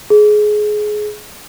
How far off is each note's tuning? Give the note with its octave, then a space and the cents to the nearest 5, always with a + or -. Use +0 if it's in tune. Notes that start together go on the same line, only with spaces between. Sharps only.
G#4 +20